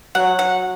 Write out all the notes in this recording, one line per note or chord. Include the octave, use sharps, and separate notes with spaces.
F#3 F#5
F#5